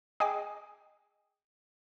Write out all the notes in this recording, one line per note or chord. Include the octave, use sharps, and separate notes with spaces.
G#4 D#5 G5 G#5 D6